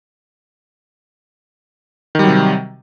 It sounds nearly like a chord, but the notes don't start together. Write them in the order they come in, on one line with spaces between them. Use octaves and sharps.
D#3 G3 F#3 C3